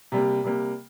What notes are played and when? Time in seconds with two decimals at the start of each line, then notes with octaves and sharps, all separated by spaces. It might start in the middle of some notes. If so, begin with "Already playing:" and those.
0.12 C3 G3 A#3
0.44 C3 G3 A#3